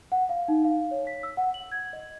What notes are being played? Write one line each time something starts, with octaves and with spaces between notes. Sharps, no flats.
F#5
F5
D#4
F5
C#5
B6
E6
F#5
F#7
G#6
D#5